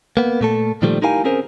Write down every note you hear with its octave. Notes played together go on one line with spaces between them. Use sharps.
A#3 B3
A#2 A3 A4
A#2 D#3 F3 G3 A3
D#4 E4 G4 A#4 F5 G#5
C4 C#4 G#4 A#4 C5